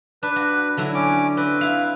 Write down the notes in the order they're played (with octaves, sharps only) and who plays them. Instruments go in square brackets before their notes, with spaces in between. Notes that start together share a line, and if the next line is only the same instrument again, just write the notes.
[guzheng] D4 [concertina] B4
[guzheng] F#4
D3 F#3 E4
[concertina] C#4 D6
[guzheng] C4 [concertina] B4
[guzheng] E4 F5